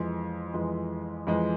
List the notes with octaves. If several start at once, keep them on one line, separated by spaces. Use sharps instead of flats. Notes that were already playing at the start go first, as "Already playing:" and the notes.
Already playing: F2 E3 G#3 C6
F2 E3 G#3
F2 E3 G#3